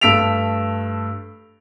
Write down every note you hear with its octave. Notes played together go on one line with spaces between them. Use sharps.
G2 A3 E6 B6 D7 F7